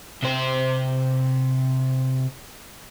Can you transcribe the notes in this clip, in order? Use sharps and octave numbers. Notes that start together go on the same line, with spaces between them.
C3 C5